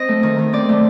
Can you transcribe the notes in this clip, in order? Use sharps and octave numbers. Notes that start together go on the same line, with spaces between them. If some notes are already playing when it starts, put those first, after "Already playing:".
Already playing: C4 D#5
A3
D#3
D#3
C4 D5
A3